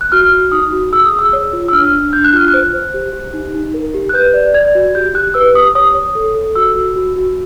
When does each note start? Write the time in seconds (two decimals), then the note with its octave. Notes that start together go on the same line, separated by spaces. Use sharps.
0.01 F#6
0.12 F#4 F6
0.32 F#4
0.52 D#4 D#6
0.72 F#4
0.92 G#4 E6
1.05 D#6
1.12 G#4
1.19 E6
1.33 C#5
1.53 F4
1.68 E6
1.72 D4 F6
1.92 D4
2.13 D4 G6
2.24 F#6
2.33 F4 F6
2.48 F#6
2.54 C5
2.74 C5
2.94 G4
3.13 G4
3.33 D#4
3.54 D#4
3.74 A#4
3.94 G4
4.09 F#6
4.14 B4 G6
4.34 D5
4.54 D5 G#6
4.75 F#4
4.95 G4 G6
5.14 G4 F#6
5.34 B4 E6
5.54 G4 D#6
5.75 C#5 D#6
5.95 C#5
6.15 A4
6.35 A4
6.55 F#4 E6
6.76 F#4
6.96 F#4
7.16 F#4